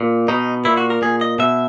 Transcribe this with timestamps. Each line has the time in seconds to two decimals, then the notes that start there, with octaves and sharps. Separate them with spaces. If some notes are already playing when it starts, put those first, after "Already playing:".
Already playing: A#2
0.28 B2 D#4
0.65 A#2 E4
0.77 F#4
0.90 A#4
1.02 A#2 G#4
1.21 D#5
1.39 B2 E5